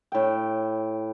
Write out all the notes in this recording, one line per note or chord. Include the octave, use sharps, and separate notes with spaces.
A2 G5